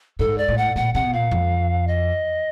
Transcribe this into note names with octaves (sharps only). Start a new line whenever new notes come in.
G#2 A4
D5
A2
F#5
A#2 F#5
C3 F#5
B2
A#2 F5
F2
D#5